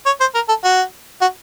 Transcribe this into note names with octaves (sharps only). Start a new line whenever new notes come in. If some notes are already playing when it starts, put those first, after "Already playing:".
C#5
C5
A#4
A4
F#4
F#4